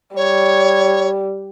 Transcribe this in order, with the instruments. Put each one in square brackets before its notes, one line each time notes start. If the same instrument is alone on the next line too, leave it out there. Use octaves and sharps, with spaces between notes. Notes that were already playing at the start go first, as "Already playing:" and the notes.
[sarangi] G3 [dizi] C#5